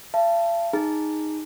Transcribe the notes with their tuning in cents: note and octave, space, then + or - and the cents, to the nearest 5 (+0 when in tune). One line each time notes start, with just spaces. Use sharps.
F5 -45 A5 +0
D#4 +0 G#4 +0 A#5 +0